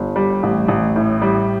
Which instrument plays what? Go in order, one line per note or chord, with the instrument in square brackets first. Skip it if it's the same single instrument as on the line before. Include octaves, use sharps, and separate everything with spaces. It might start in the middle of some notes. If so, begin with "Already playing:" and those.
Already playing: [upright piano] G1
G3
A1
A1
A2
G3